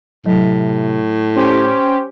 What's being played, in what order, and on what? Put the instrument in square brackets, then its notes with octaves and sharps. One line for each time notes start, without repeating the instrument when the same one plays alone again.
[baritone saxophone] A2 [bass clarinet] C3 [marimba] F#3
[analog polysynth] C#4 G4 [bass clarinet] C5